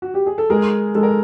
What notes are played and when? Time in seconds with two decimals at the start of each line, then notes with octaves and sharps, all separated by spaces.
0.02 F#4
0.14 G4
0.26 G#4
0.38 A4
0.50 G#3 G#4 A#4
0.95 G#3 A4
1.03 A#4